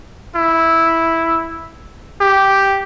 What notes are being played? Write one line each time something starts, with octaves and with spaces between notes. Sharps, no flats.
E4
G4